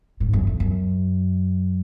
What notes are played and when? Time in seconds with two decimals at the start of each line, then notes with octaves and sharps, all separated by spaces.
0.20 G#2
0.33 F#2
0.47 F2
0.60 F#2